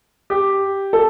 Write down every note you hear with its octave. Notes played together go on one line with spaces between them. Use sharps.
G4
A4